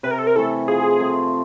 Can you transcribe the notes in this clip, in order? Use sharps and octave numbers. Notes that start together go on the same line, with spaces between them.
C3 B4
A#4
A4
A#4
E3 A3 A4
F3 G#4
A3 C4